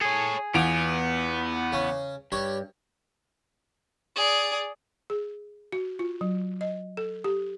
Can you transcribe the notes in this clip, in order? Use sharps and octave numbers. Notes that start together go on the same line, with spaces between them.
G#4 A4 C#5
E2 B3 F4 G#5 D7 F7
C#3 C#4
G2 G4 C#5 B5
G#4 D5
G#4
F#4
F4
F#3
D#5
A4
G4